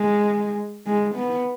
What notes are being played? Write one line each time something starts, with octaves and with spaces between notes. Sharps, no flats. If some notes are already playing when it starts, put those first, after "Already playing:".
Already playing: G#3
G#3
B3